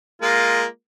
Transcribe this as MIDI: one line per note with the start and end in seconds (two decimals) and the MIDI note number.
0.22 0.64 56
0.22 0.64 58
0.22 0.64 65